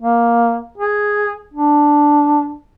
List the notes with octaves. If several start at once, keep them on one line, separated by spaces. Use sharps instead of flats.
A#3
G#4
D4